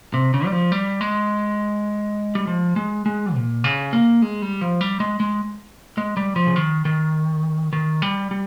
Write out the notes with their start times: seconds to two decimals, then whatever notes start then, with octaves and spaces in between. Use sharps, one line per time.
0.14 C3
0.34 C#3
0.46 G3
0.52 F3
0.72 G3
1.01 G#3
2.35 G3
2.47 F3
2.76 G#3
3.06 G#3
3.35 A#2
3.64 C#3
3.93 A#3
4.22 G#3
4.42 G3
4.61 F3
4.81 G3
5.00 G#3
5.20 G#3
5.98 G#3
6.17 G3
6.36 F3
6.47 C#3
6.56 D#3
6.85 D#3
7.73 D#3
8.02 G3
8.31 G3